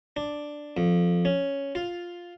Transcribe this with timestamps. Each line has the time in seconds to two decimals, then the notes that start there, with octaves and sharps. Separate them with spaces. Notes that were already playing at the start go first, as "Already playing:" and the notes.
0.16 D4
0.77 F2
1.25 C#4
1.75 F4